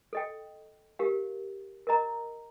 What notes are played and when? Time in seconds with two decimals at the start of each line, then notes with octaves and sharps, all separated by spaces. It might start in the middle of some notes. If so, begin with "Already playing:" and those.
0.13 A4 D#5 G5
0.99 G4 A#4 F5
1.87 A#4 D#5 A#5